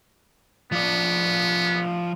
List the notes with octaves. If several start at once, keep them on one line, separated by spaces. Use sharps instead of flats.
F3 B3 D5